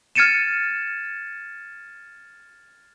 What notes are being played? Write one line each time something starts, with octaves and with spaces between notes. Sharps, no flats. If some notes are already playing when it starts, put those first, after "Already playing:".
F6 G#6 A6 C#7 D#7 E7